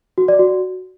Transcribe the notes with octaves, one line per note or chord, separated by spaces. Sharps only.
F#4
D5
F#4